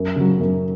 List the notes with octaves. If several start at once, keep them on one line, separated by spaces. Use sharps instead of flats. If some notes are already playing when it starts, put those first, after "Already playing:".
Already playing: F#2
C#3 F#3
F#2